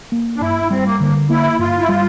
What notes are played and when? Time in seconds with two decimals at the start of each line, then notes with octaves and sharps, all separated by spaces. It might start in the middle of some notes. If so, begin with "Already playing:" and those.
0.12 A#3
0.36 D4
0.42 G2 E4
0.71 G3 C4
0.86 A#3
1.00 D3 A#3
1.30 A#3 E4
1.59 G2 F4
1.79 E4
1.89 G3 F4